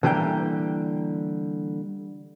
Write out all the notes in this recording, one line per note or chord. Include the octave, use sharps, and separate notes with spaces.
D3 E3 G3 A#3 G5